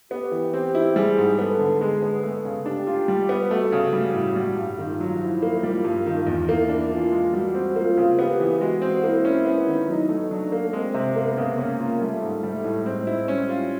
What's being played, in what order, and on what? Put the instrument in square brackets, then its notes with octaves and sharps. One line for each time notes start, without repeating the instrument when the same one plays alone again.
[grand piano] B3 [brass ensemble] G4
[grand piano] E3
[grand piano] C4 [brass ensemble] G4
[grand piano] E4
[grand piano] G3 [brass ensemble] G#4
[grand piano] G#2
[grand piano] B3 [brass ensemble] A4
[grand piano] D3
[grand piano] G#3 [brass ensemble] G#4
[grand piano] B3
A3
C#3
[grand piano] D4 [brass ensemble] G4
[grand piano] F4
G3
B3
[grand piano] A3 [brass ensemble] F#4
[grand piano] C#3
G3
A2
G3
G2
[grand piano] D#3 [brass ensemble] F4
[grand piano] F#3
[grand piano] F3 [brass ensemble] E4
[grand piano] A#3
[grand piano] G3 [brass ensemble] F4
[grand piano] G2
D#3
E2
[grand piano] A#3 [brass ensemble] E4
[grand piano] D4
[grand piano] E3 [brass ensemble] F4
[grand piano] G#3
[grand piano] G3 [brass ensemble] F#4
[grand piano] C4
[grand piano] A#3 [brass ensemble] F4
[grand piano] C#3
[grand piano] B3 [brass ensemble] G4
[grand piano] E3
[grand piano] G#3 [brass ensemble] F#4
[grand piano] C4
[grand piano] A#3 [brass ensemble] E4
[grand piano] C#4
B3
D#3
[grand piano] F#3 [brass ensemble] D#4
[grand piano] A3
[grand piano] F#3 [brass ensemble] D4
[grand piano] A#3
[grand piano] G#3 [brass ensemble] C4
[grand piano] C3
[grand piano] A#3 [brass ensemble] B3
[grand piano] C#3
[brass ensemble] A#3 [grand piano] C#4
[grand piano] F4
[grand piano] G3 [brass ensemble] A3
[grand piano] G#2
[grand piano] G3 [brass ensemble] A3
[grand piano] A2
[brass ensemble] G#3 [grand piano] C4
[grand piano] E4
[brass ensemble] G3 [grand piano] C#4
[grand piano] F4